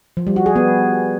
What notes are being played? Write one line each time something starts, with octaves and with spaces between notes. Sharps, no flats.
F3
G3
F#4
G#4
B3